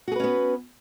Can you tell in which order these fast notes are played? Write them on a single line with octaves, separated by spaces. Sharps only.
F#4 G#4 B4 C#4 B3